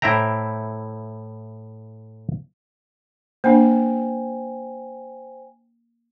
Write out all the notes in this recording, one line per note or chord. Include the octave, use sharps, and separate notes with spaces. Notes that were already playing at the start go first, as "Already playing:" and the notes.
A2 E4 C5 E5 G5 A#5
A#3 D4 C5 G5 G#5